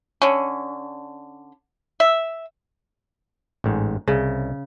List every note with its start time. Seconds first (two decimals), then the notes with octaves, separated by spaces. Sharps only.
0.22 D3 C#4
2.00 E5
3.64 A1 G#2
4.08 C2 C#3